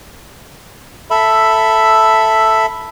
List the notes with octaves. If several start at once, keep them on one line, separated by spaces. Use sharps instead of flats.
A4 E5 B5